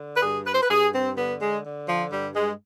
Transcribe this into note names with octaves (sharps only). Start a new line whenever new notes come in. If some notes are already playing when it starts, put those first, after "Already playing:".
Already playing: D3
B4
G2 G#4
B4
C5
B4
G2 G#4
C4
D3 B3
G#3
D3
F3
G2 G3
G#3